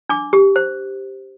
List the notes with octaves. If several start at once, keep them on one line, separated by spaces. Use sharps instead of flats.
D4 D6
G4
C5